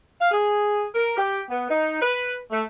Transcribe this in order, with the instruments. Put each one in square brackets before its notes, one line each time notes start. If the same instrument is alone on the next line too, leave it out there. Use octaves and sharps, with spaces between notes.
[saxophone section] F5
G#4
A#4
G4
B3
D#4
B4
A3